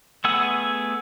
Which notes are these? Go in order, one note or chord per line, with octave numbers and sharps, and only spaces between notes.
A3 B3 G#4 F#5 E6